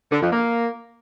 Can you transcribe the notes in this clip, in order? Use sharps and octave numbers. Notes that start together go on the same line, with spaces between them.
D3
F2
A#3